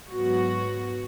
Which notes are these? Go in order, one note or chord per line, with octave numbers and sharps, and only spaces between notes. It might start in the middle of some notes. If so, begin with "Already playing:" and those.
G#2 F#3 B3 F#4